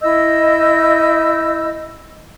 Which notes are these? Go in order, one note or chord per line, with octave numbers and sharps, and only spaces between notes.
E4 D#5 E6 G6